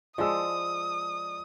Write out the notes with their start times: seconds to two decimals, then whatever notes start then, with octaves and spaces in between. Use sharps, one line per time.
0.18 F3 G#3 D5 A5 D#6 E6